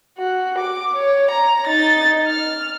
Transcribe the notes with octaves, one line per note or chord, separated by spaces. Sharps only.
F#4
D6
C#5
A#5
D#4 A6
F6